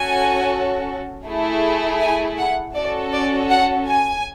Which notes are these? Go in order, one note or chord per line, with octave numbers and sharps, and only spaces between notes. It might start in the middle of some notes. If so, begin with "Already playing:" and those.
Already playing: C#4 F#4 A4 G#5
A3 E4 G#4
G#5
F#5
C#4 F#4 A4 D5
D5
F#5
G#5